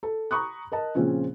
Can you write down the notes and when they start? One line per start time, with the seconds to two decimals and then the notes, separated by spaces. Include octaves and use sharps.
0.03 A4
0.31 A#5 B5 C#6 D#6 F#6
0.72 A#4 D#5 A5
0.95 A#2 C#3 F3 C4 C#4 F4